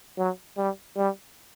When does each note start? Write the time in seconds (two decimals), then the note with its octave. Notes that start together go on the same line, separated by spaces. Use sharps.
0.17 F#3
0.57 G3
0.97 G3